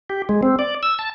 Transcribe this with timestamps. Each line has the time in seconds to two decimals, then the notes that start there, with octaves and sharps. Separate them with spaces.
0.10 G4
0.29 G#3
0.43 C4
0.59 D5
0.83 E6
0.99 A5